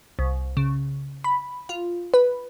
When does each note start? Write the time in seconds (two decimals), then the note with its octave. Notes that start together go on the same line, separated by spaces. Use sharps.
0.19 C2
0.57 C#3
1.24 B5
1.69 F4
2.14 B4